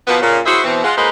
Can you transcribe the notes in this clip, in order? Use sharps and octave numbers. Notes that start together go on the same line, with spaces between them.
B2 F3 A#3 B3
A#2 C#3
E4 F#4 G#4 C5 E5
B2 E3 C4
G#3 F4 F#5
G#3 A#3 D#4 F4 B4 C5